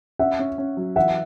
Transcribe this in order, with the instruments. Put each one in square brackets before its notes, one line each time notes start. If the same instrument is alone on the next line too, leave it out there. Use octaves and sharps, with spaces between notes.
[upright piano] C#4 [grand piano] E5 F#5
[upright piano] C#4
C#4
F#3
[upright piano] E3 [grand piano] E5 F#5